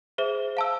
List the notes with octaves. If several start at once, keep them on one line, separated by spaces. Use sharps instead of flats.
G#4 C5 E5
F5 A5 E6